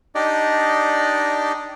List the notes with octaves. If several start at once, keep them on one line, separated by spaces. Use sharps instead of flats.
D4 D#4 G4 D5 D#5